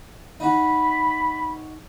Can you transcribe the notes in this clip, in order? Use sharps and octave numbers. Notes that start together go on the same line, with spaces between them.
D#4 F#4 B5